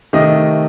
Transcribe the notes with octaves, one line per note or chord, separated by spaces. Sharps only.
C3 D#3 A3 D#5